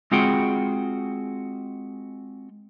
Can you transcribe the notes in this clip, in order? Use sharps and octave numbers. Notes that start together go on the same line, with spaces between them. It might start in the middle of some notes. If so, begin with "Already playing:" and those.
G#3 C4 F4 F#4 G#4 G5